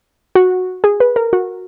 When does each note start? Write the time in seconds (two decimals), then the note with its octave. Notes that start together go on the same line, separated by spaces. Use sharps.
0.35 F#4
0.84 G#4
1.00 B4
1.16 A#4
1.33 F#4